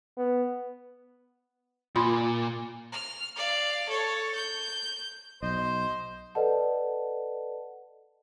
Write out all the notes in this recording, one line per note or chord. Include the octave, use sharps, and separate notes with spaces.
B3
A#2 F4 B5 C6
F6
D5 F5
A4 C#5
G6
B1 C5 D#5
A4 B4 D5 D#5 F#5 A5